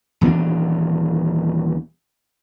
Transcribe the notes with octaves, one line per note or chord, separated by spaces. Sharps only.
D#1 E3 B3 D4